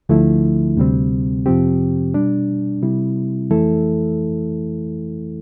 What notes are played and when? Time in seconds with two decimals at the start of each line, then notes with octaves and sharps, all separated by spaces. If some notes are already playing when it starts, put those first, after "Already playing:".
0.09 D2 D3 F3 A3 E4
0.78 D2 C3 G3 C4
1.46 F2 C3 F3 C4 G4
2.14 B2 G3 D4
2.82 C3 G3 C4 E4
3.50 F2 E3 A3 E4 A4